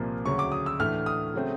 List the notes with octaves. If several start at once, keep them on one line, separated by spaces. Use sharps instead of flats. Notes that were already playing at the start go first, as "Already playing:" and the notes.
Already playing: C2 A#2 F3 A#3
D2 C#3 F#3 C#6
D6
D#6
E6
A2 E3 A3 D4 F6
D#6
C#3 F#3 A3 C4